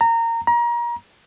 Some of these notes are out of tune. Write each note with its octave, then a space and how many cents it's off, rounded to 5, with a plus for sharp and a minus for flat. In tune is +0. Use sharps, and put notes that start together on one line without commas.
A#5 -20
A#5 +30